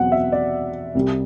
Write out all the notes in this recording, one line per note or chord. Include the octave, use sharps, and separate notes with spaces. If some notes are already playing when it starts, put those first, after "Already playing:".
Already playing: E2 B2 F#3 C4 F#5
E5
D5
C2 C3 G3